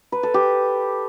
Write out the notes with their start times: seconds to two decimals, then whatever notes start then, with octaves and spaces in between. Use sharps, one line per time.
0.12 B4
0.23 A4
0.34 G4